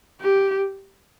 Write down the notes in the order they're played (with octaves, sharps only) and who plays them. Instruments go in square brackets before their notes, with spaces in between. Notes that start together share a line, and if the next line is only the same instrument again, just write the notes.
[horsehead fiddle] G4